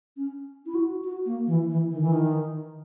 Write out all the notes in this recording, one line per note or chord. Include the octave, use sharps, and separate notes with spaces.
C#4
E4
F#4
F#4
A#3
E3
E3
D#3
E3
D#3